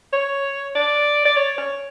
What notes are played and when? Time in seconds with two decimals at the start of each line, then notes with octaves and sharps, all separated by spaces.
0.13 C#5
0.75 D5
1.25 D5
1.37 C#5
1.58 C#5